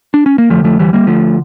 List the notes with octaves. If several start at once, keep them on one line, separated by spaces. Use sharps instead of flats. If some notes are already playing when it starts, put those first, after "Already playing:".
D4
C#4
A#3
F2 D3 F3 A3
F3 A3
E3 G3
G3 A#3
D2 D3 F3 A3